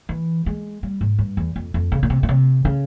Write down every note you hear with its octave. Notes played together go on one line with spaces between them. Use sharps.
E3
G#3
G3
G#2
G2
E2
F2
F2
C#3
A#2
C3
A#2
C3
C#3